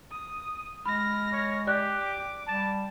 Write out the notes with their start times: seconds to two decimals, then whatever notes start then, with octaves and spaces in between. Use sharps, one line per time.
0.11 D#6
0.85 G#3 B5 F6 A#6
1.33 C#5
1.67 G4 D5 F#6
2.00 D6
2.47 G3 A5